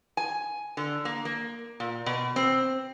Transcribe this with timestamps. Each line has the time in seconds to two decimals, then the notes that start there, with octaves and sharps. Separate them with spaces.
0.17 G#5
0.77 D3
1.05 A#3
1.25 A#3
1.80 A#2
2.06 B2
2.36 C4